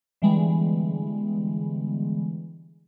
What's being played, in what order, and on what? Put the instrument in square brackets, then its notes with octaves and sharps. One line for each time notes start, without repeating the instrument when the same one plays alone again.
[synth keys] D3 E3 G3 G#3 B3